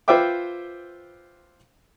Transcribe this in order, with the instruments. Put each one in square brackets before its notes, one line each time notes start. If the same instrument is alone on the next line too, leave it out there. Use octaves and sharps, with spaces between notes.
[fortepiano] F4 B4 C5 E5 G5 D6